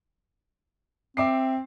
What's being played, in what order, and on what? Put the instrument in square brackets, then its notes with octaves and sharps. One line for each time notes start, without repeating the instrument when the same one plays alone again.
[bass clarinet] C4 [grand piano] E5 D6 C7